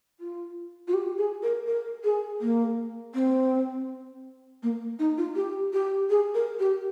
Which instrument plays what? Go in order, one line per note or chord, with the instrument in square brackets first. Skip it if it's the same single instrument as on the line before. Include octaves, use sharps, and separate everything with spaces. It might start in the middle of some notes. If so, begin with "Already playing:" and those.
[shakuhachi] F4
F4
G4
G#4
A#4
A#4
G#4
A#3
C4
A#3
D#4
F4
G4
G4
G#4
A#4
G4